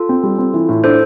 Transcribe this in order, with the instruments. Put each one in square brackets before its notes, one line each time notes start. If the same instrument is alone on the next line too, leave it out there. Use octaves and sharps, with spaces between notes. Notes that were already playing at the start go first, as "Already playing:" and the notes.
Already playing: [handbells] F4 A4
[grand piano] C4
G3
C4
E3
A2
[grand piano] D4 [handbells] A4 C5